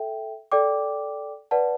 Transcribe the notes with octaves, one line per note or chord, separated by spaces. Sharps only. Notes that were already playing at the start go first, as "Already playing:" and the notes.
Already playing: A4 E5 G5
A4 D5 G5 D6
B4 D5 F#5 A5